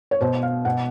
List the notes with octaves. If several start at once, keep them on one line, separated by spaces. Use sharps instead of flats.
C#5
B2 C5
F5
B2 F#5